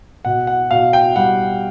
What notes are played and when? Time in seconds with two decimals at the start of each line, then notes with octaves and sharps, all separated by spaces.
0.25 B2 F#5
0.47 F#5
0.71 B2 F5
0.93 G5
1.16 G3 F#5